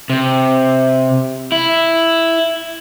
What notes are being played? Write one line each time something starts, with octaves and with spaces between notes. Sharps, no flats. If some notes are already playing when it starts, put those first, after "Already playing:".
C3
E4